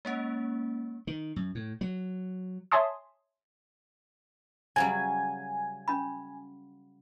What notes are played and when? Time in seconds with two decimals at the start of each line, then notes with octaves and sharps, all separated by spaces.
0.05 G#3 A#3 C#4
1.07 D#3
1.36 F#2
1.55 A2
1.81 F#3
2.72 C#5 E5 G#5 A5 C6 D#6
4.76 C#3 F#3 G3 G#5
5.88 C#4 B5